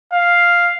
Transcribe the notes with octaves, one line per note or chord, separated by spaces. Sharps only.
F5